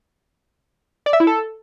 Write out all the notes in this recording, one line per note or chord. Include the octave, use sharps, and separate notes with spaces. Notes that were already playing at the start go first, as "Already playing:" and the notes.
D5
E5
E4
A4